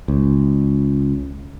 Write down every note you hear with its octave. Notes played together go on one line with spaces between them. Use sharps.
C#2